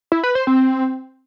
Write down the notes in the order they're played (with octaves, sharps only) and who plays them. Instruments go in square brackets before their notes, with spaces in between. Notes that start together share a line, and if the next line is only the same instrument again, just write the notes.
[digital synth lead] E4
B4
C5
C4